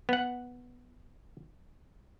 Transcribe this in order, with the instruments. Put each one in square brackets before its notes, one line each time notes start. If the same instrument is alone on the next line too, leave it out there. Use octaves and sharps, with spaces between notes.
[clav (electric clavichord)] B3 F#5